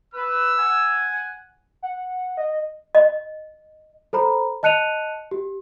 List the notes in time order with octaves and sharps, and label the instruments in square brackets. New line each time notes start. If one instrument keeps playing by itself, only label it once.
[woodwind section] B4 [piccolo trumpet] E6
[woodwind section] F#5 G#5
[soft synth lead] F#5
D#5
[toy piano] D#5
[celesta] A4 C5 A#5 B5
D#5 A5 F#6 C#7 D#7 F7
G4